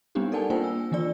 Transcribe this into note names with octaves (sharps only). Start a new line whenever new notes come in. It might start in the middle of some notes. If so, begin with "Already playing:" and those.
G3 B3 C4 D4 D#4 G4
A4 A#4 D5 F#5 G#5 A5
A#3 D4 F4 C5 G5 G#5
G#5 E6
D#3 E3 D4 F4 D5 E6